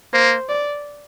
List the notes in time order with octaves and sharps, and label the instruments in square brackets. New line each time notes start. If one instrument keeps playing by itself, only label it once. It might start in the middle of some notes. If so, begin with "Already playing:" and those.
[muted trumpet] A#3 [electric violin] C5
[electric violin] D5